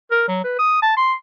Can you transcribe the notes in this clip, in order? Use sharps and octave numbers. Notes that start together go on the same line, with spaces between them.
A#4
F#3
B4
D#6
A5
C6